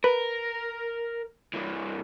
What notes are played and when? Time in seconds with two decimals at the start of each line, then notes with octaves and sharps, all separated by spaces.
0.04 A#4 B4
1.53 G2 E3